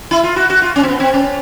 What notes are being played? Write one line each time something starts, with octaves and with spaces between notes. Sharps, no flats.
E4
F4
F#4
F#4
F4
C#4
C4
B3
C4
C#4